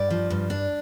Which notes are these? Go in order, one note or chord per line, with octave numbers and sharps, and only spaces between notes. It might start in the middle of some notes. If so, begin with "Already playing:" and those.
Already playing: G2 D5
F3
G2
D4